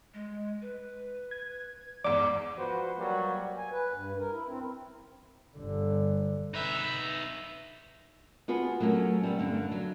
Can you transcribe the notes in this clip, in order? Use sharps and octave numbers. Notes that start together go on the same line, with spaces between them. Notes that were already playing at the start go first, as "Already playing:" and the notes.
G#3
B4
G#6
E2 G#2 D5 D6
F3 F#4 B4 C5
F#3 G3 A#3 F#4
G#5
B4
G2
A#4
E4
C4
G1 D3
D#4 B4 E5
B3 F4 F#4 G#4 B4
F#3 A3 A#3 C#4
G3 A3 B3
G2 D3 D4
F#3